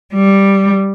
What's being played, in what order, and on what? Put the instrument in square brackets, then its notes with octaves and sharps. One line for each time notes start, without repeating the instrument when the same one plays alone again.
[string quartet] G3